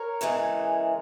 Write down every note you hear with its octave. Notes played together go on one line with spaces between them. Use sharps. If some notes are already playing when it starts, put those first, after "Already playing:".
Already playing: A#4 C#5
E2 C#3 E3 G#3